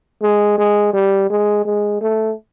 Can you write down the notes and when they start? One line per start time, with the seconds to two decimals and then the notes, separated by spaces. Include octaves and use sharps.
0.22 G#3
0.58 G#3
0.94 G3
1.30 G#3
1.65 G#3
2.01 A3